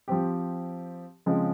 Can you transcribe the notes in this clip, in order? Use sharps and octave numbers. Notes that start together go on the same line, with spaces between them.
F3 C4 G4
C#3 F3 G#3 C4